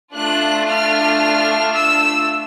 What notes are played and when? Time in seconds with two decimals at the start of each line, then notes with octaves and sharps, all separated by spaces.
0.13 A3 D4 F4 F#6
0.67 F6
1.73 E6